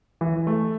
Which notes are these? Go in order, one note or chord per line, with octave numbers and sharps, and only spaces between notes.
E3
A3